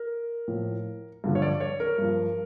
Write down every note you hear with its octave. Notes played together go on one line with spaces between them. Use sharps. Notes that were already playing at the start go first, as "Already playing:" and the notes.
Already playing: A#4
A2 F3
G2 D3 F3
C#5
D5
C#5
A#4
G2 F3